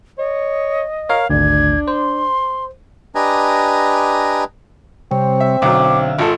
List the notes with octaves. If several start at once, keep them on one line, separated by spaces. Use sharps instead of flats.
C#5 D#5
A#4 C#5 F5
G#1 D2 D4 G#6
C5 C6
D4 G4 B4 D#5 G#5 A#5
C3 G3 C4 C#5
E5
B1 D3 F#3 E5 F5 D6
G#1 F4 A4